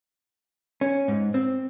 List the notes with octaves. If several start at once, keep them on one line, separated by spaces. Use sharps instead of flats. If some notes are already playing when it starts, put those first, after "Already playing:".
C#4
G#2
C4